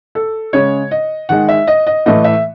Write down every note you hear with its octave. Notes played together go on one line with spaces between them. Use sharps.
A4
C#3 G#3 C#5
D#5
D#3 G#3 F#5
E5
D#5
D#5
A2 E3 A3 D#5
E5